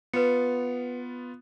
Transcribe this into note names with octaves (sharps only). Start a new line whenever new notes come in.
B3 F4 B4 C#7